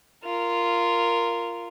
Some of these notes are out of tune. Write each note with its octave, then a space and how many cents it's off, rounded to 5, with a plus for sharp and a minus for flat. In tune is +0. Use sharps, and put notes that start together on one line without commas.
F4 -10 A#4 -5